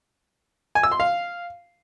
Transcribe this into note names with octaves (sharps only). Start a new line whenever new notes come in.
G#5
E6
C6
F5